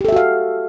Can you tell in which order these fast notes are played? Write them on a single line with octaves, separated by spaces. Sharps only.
G4 A4 E5 F#4 F5